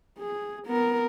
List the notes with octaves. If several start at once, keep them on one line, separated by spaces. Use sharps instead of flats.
G#4
B3 A#4